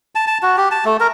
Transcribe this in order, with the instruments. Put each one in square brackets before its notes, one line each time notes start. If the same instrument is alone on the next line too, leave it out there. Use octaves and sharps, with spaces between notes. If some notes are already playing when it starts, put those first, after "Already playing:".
[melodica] A5
A5
F#4
G4
A5
A3
A#4